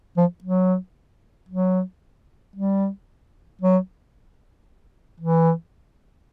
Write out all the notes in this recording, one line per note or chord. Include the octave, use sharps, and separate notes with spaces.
F3
F#3
F#3
G3
F#3
E3